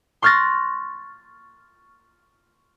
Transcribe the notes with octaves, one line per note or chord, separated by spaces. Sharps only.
C6 C#6 F6 F#6 A6 A#6